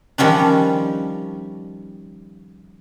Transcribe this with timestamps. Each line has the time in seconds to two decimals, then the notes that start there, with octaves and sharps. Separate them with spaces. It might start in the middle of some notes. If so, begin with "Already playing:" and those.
0.18 D#3 F3 G3 C#4 D4